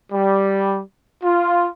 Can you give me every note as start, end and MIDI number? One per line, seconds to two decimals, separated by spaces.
0.12 0.80 55
1.23 1.68 65